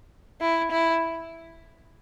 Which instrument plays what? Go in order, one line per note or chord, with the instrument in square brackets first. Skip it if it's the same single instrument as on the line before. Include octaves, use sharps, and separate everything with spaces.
[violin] E4
E4